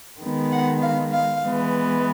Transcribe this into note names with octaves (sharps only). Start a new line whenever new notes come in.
D#3 G#3 B3
F#5
F5
F5
E3 G#3 B3